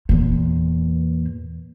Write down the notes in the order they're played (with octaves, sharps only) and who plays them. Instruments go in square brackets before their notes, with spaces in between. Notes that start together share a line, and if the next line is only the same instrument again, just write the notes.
[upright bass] E2 A#2